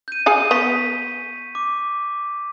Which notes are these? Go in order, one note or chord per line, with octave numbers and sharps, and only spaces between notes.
G6 D#7
G#4 F5 G#5 C#7
B3 C#6 B6
D6